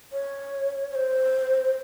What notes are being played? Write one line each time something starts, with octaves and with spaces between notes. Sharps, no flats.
C#5
C#5
C5